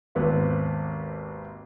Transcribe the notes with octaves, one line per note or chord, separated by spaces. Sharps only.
G#1 D#2 B3 C4 F4